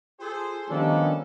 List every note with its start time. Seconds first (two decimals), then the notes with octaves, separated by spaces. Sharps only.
0.20 F4 G#4 A4 C5
0.70 D#3 F3 G3 B3 C#4 D4 A4